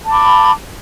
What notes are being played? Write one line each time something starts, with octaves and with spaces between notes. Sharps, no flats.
A5 B5 D6